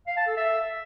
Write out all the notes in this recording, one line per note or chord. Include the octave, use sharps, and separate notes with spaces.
F5
A5
A4
E5